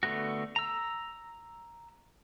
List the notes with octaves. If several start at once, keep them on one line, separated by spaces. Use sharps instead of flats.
D3 A3 B3 F#4
A#5 E6